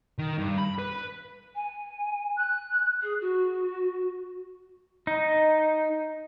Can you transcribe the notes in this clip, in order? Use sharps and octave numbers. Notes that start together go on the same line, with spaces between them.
D#3
G2
B5
B4
G#5
F#6
G#4
F#4
D#4